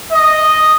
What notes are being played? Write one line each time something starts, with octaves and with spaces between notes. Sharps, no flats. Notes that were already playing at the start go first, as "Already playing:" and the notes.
D#5